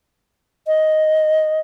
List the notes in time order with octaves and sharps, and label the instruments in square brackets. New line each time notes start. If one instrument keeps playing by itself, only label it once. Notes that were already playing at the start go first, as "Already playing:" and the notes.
[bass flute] D#5